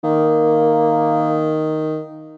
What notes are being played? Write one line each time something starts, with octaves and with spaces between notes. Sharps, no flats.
D#3 A#3